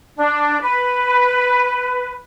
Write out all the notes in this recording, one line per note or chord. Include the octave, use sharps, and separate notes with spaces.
D4
B4